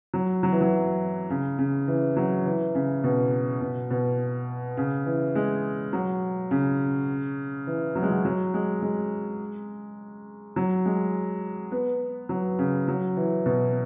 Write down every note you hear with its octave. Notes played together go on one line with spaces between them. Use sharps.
F#3
F#3
E3
F#3
C#3
C#3
E3
F#3
E3
C#3
B2
B2
B2
C#3
E3
G#3
F#3
C#3
E3
F#3
G#3
F#3
F#3
G#3
G#3
F#3
G#3
B3
F#3
C#3
F#3
E3
B2